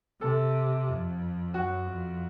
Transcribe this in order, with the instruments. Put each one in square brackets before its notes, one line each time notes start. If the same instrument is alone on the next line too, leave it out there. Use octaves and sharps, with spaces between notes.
[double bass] C3 [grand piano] A4
[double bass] F2
[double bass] F#2 [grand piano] F#4
[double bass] F2